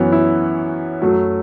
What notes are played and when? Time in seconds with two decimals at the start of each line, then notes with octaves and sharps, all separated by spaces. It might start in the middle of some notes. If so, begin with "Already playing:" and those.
Already playing: F#2 E3 B3 C#4
0.12 E4
1.02 F#2 F#3 A3